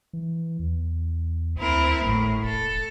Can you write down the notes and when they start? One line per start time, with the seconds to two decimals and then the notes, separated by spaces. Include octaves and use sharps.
0.13 E3
0.59 E2
1.57 D2 C4 E4 A#4
2.04 G#1 A2
2.43 E1 A4